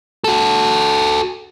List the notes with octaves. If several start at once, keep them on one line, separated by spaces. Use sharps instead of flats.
F#4 A4